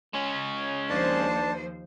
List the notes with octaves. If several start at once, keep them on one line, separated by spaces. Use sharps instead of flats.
G#3 C#4
D#2 F3 D4 C5 A5